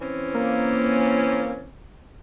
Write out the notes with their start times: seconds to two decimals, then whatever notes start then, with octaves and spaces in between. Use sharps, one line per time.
0.01 E3 C4 C#4
0.34 A#3